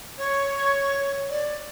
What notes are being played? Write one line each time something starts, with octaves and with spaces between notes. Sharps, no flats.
C#5
D5